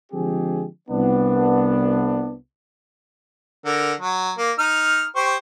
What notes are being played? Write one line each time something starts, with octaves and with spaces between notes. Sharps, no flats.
D3 F3 G#3 C4 G4 G#4
C2 B3 D4
D3 A#4
F#3
A#3
D#4 F6
G4 C5 C#6